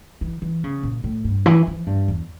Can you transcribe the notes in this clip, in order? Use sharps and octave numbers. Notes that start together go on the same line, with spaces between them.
E3
E3
C#3
A#2
A2
G2
E3
F3
G2
E2